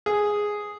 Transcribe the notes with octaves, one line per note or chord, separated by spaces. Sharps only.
G#4